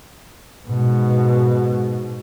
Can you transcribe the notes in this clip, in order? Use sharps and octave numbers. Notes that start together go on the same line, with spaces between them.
G#2 B2